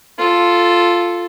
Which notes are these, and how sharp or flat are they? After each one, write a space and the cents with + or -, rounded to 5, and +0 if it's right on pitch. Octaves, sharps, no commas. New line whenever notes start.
F4 +0 A4 +0